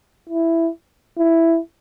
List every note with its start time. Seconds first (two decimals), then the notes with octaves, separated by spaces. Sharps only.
0.29 E4
1.19 E4